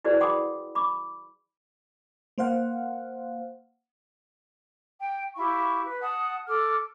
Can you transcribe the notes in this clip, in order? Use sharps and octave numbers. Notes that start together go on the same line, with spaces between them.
E4 F#4 G#4 B4 C5 D5
F#5 G5 B5 C6 D6 D#6
B5 D6
A#3 C5 F5 F#5
G5
E4 G4 F5 C#6
B4
F#5 A5 D#6
A4 D6 F6